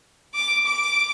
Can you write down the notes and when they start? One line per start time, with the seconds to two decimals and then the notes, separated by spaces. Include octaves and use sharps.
0.34 D6
0.66 D6